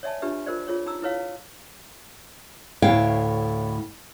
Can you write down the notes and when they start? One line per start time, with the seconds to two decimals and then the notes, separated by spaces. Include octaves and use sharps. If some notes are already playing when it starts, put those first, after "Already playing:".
0.03 C#5 D5 E5 G#5 A5
0.22 D4 F4 G4 B4 E5
0.46 F4 A#4 C5 D5
0.68 F4 G#4 C#5
0.86 D#4 A#5 E6
1.02 E4 B4 C#5 F5
2.82 D2 A2 E4 C#5 F5 G5